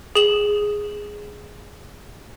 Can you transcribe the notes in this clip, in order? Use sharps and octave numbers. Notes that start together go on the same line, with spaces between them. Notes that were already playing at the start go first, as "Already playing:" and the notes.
G#4 E7 F#7